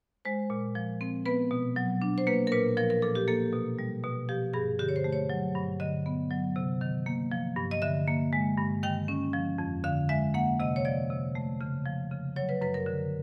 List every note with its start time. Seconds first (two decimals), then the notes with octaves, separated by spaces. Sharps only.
0.25 G#3 C5
0.50 A#2
0.75 F3
1.01 C4
1.26 B3 B4
1.51 B2
1.76 F#3
2.02 D4
2.18 C5
2.27 A#3 B4
2.47 A#4
2.52 A#2 B4
2.77 F3 A#4
2.90 A#4
3.02 A#2 A4
3.15 G4
3.28 A#3 A4
3.53 B2
3.79 G3
4.03 B2
4.29 F3 G4
4.54 G2 G#4
4.79 D3 G4
4.89 C#5
4.96 C5
5.04 A3
5.12 C#5
5.30 F#3
5.55 G2
5.80 D3 D#5
6.06 B3
6.31 F#3
6.56 C3
6.81 D#3
7.06 A#3
7.32 F3
7.57 G2
7.71 D#5
7.82 D3 E5
8.07 A#3
8.33 G#3
8.58 G2
8.83 D#3 G5
9.08 C#4
9.33 F3
9.58 F2
9.84 D3 F5
10.09 G#3 E5
10.34 A#3 F#5
10.60 C3 D#5
10.76 C#5
10.85 F3 D5
11.10 C3
11.35 A3
11.61 C#3
11.86 F3
12.11 C#3
12.36 F#3 C#5
12.49 B4
12.61 F#2 B4
12.74 A#4
12.86 D3